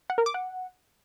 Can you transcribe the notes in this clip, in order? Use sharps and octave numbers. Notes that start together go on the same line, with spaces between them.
F#5
A#4
D6
F#5